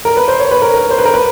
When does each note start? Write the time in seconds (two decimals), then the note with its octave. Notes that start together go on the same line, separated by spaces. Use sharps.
0.05 A#4
0.17 B4
0.28 C5
0.39 C#5
0.51 B4
0.62 A#4
0.74 A#4
0.91 C5
0.98 B4
1.05 A#4
1.14 B4